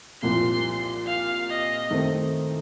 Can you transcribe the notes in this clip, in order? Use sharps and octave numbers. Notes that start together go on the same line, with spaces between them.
C2 A#2 F3 C6
F5
D#5
D#3 A3 C4